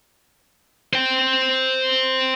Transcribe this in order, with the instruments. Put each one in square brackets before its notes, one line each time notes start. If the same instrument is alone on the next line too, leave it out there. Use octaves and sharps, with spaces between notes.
[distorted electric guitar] C5 G5